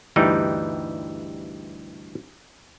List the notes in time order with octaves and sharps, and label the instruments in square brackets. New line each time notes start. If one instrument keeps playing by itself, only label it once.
[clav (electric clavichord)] D2 G2 E3 G3 D#4